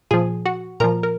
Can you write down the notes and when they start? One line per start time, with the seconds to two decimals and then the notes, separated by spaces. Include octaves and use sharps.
0.11 A#2 F3 G#4 G#5
0.46 F#4 F#5
0.80 A#2 A#4 A#5
0.84 F3
1.03 A#4